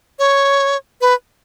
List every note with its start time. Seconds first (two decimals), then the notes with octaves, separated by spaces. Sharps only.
0.19 C#5
1.01 B4